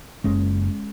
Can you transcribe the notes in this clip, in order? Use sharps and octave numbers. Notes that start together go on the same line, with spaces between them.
F#1 G#3 C#4